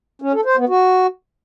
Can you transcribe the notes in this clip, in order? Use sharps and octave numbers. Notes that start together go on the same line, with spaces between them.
C#4
A4
C5
B3
F#4